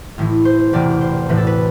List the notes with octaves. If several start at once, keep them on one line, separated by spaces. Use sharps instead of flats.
A1 A2 E3
C5
E1 E2 C3 E3 D5
C5
A1 A2 E3 B4
A4
B4